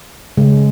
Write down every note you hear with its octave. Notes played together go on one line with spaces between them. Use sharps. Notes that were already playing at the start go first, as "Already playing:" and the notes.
C#3 G#3